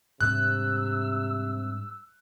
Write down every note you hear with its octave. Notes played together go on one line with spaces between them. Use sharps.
G#2 C3 G3 D4 E6 F#6